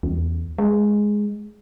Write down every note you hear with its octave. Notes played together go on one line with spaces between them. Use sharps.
E2
G#3